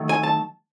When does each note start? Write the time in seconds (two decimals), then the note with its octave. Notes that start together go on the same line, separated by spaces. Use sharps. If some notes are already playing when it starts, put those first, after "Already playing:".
Already playing: D#3 F#3 A3
0.09 G#5
0.23 A5